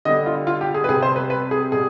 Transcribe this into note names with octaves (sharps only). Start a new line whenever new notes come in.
D3 G3 B3 D#5
F4
F4
G4
G#4
B4
C3 G3 C4 G#4
C5
B4
B4
G#4
B2 G3 G#4